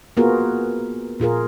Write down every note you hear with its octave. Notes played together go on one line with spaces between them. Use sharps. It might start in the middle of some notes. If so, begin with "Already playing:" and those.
A#3 B3 F4 F#4 G#4 A#4
A#2 F4 G#4 A#4